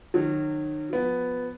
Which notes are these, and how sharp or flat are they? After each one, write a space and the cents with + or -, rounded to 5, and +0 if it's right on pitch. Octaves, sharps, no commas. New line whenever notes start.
D#3 -35 F#3 -25
F3 +25 B3 +5